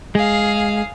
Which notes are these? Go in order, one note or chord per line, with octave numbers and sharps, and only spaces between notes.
G#3 G#4 F5